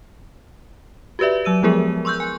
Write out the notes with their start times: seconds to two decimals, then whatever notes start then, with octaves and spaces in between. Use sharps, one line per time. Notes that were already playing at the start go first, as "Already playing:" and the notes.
1.19 F#4 G4 B4 D5 E5
1.45 F#3 E6 D#7
1.63 F3 G#3 B3 E4 G#4 A#4
2.05 C6 C#6 E6 F#6 G6
2.20 G#5